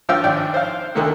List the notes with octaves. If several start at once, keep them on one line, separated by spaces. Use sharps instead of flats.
G2 F3 C5 F5 G5 E6
G#1 D5 G5 F#6
C5 F5
D2 D3 D#3 A#3 A4